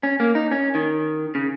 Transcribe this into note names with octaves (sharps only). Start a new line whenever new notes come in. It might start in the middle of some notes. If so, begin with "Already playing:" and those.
C#4
A#3
D#4
C#4
D#3
C#3